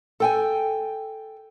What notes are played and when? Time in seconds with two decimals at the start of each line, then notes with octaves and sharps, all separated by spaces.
0.20 A4 G5 G#5